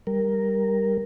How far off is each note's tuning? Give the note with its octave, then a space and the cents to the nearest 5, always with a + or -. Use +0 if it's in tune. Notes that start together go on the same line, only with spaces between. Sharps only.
G3 +0 A#4 +0